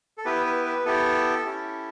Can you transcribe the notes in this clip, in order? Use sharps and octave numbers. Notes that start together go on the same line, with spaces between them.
A4
B3 E4 G4 B4
B4
B4
B3 E4 G4 A4
C#4 E4 G4